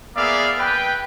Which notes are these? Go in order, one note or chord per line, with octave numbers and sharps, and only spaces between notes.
A#3 B3 G#4 D5 E5 F5
B4 G5